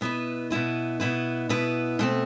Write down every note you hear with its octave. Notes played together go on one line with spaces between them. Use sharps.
B2 B3 E4 B4
B2 B3 E4 B4
B2 B3 E4 B4
B2 B3 E4 B4
B2 A3 C4